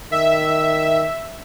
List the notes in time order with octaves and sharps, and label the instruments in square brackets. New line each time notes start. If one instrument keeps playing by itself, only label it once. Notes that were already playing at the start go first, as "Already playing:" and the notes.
[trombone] D#3 [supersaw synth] E5